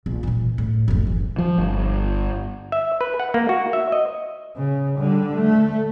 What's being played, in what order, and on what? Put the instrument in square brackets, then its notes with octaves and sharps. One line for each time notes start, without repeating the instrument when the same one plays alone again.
[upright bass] A#1
A#2 E3
A2
F#1 D2
E3
[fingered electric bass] F3
G1
[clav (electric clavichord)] E5
B4
F#5
A#3
F#4
E5
D#5
[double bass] C#3
D3 G3
A3